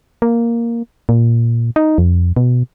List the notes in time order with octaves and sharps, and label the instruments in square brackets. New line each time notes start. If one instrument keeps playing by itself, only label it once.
[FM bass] A#3
A#2
D#4
F2
B2